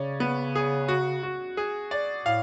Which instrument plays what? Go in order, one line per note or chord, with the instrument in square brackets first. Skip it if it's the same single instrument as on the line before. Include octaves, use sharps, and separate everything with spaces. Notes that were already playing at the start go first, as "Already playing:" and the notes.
Already playing: [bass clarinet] C#3 [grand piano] C#4 D5
[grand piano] B3
G#4
F#4
F#4
G#4
D5
[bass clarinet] A2 [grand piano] F5